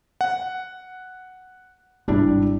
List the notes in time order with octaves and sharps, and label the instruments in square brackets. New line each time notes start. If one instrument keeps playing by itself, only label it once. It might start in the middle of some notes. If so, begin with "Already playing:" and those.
[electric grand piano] F#5
[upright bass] G#1 [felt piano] G3 D4 E4